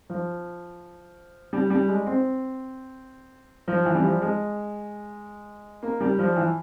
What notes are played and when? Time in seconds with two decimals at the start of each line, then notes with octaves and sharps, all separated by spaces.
0.10 F3
1.53 G3
1.70 G3
1.88 G#3
2.06 C4
3.68 F3
3.86 E3
3.95 G3
4.03 F3
4.22 G#3
5.83 A#3
6.01 G3
6.19 F3
6.36 E3